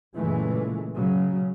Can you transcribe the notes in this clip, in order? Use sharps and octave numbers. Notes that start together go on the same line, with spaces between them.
F#1 A#2 C#3 E3 G#3 A3
C#3 F#3